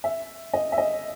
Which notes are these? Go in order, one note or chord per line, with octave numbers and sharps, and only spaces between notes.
E5
D#5
E5
D#5